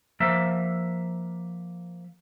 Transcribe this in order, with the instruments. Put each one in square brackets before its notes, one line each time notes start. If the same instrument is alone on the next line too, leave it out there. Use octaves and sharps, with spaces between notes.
[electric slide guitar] F3 A#3 E5